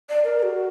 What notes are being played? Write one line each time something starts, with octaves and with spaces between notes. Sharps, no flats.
D5
A#4
A#4
F#4